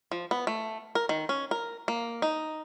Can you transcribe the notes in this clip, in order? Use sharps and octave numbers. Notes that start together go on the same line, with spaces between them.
F3
B3
A3
A#4
D#3
C#4
A#4
A#3
D#4